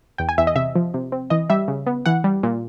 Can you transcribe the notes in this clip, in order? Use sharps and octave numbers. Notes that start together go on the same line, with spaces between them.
E2 G5
G#5
E2 E5
D#5
C3 E5
F3
C3
C4
E3 D#5
G3 E5
C#3
B3
E3 F#5
G3
A#2